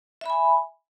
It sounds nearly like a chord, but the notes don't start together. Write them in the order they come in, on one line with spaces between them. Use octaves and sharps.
E5 B5 G#5